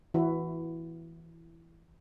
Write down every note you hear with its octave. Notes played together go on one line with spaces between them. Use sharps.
E3 E4 F#4